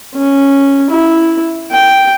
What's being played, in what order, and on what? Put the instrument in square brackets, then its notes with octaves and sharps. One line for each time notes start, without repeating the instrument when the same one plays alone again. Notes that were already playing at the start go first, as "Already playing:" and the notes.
[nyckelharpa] C#4
E4
G5